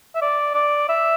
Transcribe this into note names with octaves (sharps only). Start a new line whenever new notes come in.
E5
D5
D5
E5